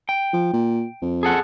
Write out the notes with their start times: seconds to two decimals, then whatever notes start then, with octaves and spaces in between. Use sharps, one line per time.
0.09 G5
0.33 F3
0.53 A#2
1.02 F2
1.23 G#4 A4 F#5